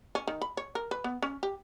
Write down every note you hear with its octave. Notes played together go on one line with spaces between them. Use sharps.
C#4
D#3
B5
C#5
A#4
B4
B3
C#4
G4